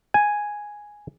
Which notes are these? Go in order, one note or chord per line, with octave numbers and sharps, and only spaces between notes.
G#5